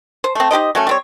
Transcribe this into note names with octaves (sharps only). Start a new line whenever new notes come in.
C5
A3 C4
D#4 G4 C5 D#5
F#3 A3 C#4
G3 C4 C#5